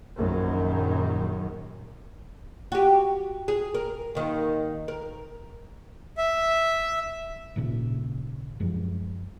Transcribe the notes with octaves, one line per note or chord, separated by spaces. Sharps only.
A#1 F#2 D#3 F#3
F#4 G4
G#4
A#4
D#2 D#3
A#4
E5
G#1 D#2 A#2 C#3
F#2 F3 G#3